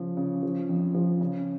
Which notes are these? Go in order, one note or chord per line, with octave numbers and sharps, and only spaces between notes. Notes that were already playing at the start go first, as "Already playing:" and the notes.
Already playing: C#3 F3
C#3
F3
F2
F3
C#3